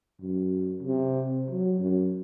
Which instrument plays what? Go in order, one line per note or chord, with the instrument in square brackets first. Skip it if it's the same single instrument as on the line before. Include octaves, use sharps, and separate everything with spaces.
[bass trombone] F#2
C3
F#3
F#2